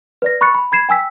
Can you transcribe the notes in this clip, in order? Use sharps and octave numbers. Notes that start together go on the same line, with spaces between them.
B4 D5 A#6
B5 C#6 F#6 A6 C#7
B5
B5 G#6 C7 E7
G5 G#5 E6 B6